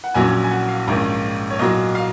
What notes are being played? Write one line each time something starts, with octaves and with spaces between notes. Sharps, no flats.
F#5
A#1 A#2 F#3 C#4 G#5
G#5
F#5
F5
A#1 G#2 D#3 A#3 C#4
C#5
B1 A#2 F#3 D#5
F5